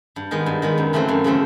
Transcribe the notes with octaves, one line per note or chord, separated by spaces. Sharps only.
G2
D#3 G#3 B3
G2
D#3 G#3 B3
F#2
C#3 E3 A3 C4
F#2
C#3 E3 A3 C4